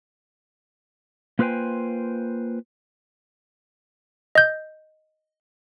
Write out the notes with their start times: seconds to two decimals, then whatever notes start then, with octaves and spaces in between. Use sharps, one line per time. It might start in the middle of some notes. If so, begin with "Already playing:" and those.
1.39 A#3 F4 B4 C5 G5 G#5
4.35 D#5 G6